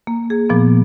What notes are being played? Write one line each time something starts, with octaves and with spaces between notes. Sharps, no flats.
A#3
G#4
A#2 F3 A#3 B3